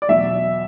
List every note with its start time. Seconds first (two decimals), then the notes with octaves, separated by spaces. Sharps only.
0.02 D5
0.08 E2 B2 F#3 E5